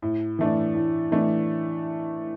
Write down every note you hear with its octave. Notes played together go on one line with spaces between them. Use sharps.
A2
E3 A3 D4
A2
E3 A3 D4